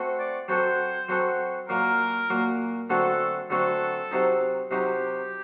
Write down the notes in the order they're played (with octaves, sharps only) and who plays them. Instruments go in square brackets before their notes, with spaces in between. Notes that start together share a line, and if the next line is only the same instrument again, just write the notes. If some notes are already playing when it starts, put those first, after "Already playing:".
Already playing: [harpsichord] A3 C4 F#4 A4
[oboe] D5
[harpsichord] F#3 C4 F#4 A4 [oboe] C5
[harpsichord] F#3 C4 F#4 A4
[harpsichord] A#2 F#3 A#3 [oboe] A#4
[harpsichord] A#2 F#3 A#3
[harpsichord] D3 F#3 A3 C4 F#4 [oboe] A4
[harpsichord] D3 F#3 A3 C4 F#4 [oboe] A4
[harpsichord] C3 F#3 C4 D#4
[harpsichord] C3 F#3 C4 D#4 [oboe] G4